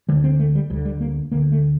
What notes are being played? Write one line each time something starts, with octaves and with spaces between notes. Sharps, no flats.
D2 D3 G3
C4
A3
G3
D2 D3 F3
G3
A#3
D2 D3 A#3
A3